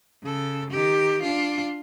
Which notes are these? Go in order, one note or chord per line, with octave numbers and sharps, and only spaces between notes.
C#3 A4
D#3 G4
D4 F4